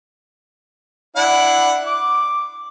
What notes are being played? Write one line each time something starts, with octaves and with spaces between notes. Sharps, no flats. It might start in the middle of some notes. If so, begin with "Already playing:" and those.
D4 E4 F#5
D6